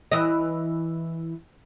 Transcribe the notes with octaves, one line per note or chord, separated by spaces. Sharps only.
E3 D#5